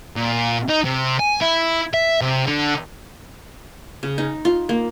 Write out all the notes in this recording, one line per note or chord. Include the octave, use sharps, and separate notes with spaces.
A#2
D#4
C3
G#5
E4
E5
C3
D3
C#3
D#4
F4
A#3